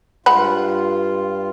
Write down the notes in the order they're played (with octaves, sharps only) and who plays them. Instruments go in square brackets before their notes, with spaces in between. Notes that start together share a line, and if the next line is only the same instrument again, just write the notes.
[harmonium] G2 F4 [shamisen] G#3 F#5 B5